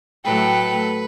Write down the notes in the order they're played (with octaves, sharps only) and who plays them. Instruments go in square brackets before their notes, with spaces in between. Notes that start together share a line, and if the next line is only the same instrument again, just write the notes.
[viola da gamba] A2 F#3 A3 [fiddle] A4 [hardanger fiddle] B4 [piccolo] G5